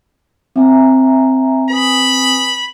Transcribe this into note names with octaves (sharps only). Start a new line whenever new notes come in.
C4 E5 G#5 A#5
B4 G#5 B5 D#6